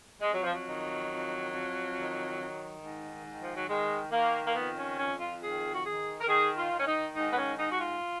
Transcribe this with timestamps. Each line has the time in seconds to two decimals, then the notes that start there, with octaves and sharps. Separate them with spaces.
0.22 F2 G#3
0.32 F#3
0.42 F3
0.53 F#3
0.66 D#3
1.09 F2
1.52 F2
1.96 D#3
2.39 D#3
2.82 G#2
3.25 D#3
3.42 F3
3.54 F#3
3.68 D#3 G#3
4.11 D#3 A#3
4.45 A#3
4.54 F2 B3
4.76 C#4
4.97 F2 C#4
5.20 F4
5.41 D#3 G#4
5.73 F#4
5.84 D#3 G#4
6.20 A#4
6.27 D#3 G#4
6.56 F4
6.71 D#3
6.78 C#4
6.85 D#4
7.14 G#2 D#4
7.31 B3
7.36 C#4
7.56 G#2 D#4
7.70 F#4
7.79 F4